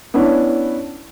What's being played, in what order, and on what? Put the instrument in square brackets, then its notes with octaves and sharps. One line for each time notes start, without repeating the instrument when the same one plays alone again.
[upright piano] B3 C#4 D4 E4